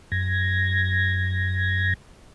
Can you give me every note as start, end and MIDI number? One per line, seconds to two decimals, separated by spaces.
0.12 1.94 42
0.12 1.94 92
0.12 1.94 94